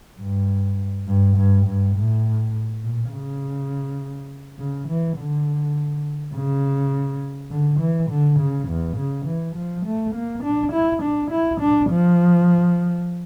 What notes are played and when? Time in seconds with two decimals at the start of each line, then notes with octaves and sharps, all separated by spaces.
0.20 G2
1.08 G2
1.37 G2
1.66 G2
1.95 A2
2.84 A#2
3.12 C#3
4.59 C#3
4.88 E3
5.18 D3
6.34 C#3
7.51 D3
7.80 E3
8.10 D3
8.40 C#3
8.68 E2
8.98 C#3
9.26 E3
9.56 F3
9.86 A3
10.15 A#3
10.44 D4
10.72 E4
11.02 D4
11.31 E4
11.61 D4
11.90 F3